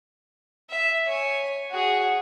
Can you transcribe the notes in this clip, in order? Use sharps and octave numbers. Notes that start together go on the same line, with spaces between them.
E5
C#5 G#5
F#4 G#4